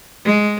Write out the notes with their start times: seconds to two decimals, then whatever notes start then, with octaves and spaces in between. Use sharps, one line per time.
0.25 G#3